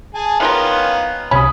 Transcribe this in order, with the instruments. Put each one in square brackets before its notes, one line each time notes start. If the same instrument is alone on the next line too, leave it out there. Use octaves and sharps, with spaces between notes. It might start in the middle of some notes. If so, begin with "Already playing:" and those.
[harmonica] G#4 G#5 A5
[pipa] D#3 F4 A#4 [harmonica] B3 C#4 F5
[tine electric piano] C2 C3 [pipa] C#4 [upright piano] B5 D#6